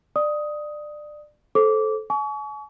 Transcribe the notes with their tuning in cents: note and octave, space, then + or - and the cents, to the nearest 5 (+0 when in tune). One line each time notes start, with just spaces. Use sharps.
D5 +25 D#6 +10
A4 -15 C5 +15 D6 -15
G#5 +40 C#6 +35